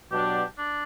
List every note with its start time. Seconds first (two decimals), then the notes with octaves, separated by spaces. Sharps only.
0.11 B2 F#3 B3 D4 G4
0.58 D4